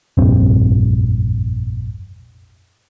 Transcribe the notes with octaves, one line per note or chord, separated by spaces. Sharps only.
F1 A#1 G2 C4